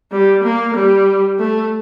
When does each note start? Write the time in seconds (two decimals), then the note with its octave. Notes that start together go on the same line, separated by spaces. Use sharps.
0.12 G3
0.43 A#3
0.74 G3
1.39 A3